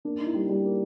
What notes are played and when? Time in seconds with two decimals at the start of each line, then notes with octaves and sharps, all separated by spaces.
0.05 A#3 D4
0.20 D#4
0.27 E4
0.34 G3
0.49 G3
0.64 A#3